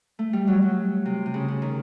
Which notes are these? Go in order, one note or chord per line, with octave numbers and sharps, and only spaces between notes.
A3
G3
F#3
F#3
C3
C3
C#3
C#3
D#3